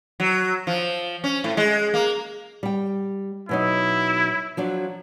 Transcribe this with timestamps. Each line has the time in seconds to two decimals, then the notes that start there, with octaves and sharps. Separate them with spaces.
0.20 F#3
0.67 F3
1.24 C#4
1.44 A2
1.57 G#3
1.94 A#3
2.63 G3 G5
3.49 B2 F#3 D#4 E4
4.57 F3 F#3 D4